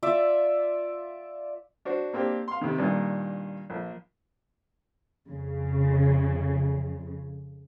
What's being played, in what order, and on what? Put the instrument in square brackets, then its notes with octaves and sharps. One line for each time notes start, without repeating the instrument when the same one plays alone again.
[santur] F4 D5 E5
[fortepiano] D4 F#4 C5
A#3 C4 D4 G4
F5 C6
C3 D#3
G2 A#2 D#3
A#1
[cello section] F2 C#3